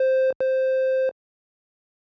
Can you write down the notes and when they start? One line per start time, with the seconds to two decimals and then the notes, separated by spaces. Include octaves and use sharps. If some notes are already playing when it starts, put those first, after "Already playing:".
Already playing: C5
0.40 C5